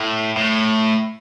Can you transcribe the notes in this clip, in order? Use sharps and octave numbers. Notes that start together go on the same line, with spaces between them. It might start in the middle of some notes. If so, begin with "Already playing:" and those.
Already playing: A2
A2